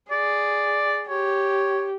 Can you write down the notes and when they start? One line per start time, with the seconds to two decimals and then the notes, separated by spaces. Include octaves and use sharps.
0.11 G#4 D5
1.09 G4 C#5